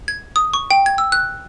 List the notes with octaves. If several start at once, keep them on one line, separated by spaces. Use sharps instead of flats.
G#6
D#6
C#6
G5
G#6
E6
F#6